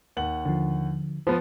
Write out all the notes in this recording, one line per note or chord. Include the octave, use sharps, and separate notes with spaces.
D#2 F#5 F#7
D3 F3
F3 B3